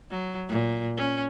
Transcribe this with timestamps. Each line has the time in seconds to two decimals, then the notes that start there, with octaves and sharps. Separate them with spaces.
0.10 F#3
0.49 A#2
0.97 C#4